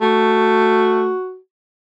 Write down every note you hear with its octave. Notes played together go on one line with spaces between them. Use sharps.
A3 F#4